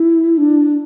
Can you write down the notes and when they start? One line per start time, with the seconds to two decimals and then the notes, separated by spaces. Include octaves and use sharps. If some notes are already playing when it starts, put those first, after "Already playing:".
Already playing: E4
0.38 D4